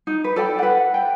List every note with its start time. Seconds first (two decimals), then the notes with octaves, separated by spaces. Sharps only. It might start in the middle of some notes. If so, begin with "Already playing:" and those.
0.07 D#4
0.24 B4
0.36 A4 D5 G5
0.59 B4 F#5
0.94 G5